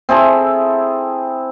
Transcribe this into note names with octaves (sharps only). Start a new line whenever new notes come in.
C4 E4 G#4 A4